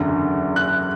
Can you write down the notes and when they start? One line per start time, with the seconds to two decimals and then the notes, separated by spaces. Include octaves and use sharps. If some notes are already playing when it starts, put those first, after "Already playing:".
Already playing: F#1 E2 D3
0.56 F#6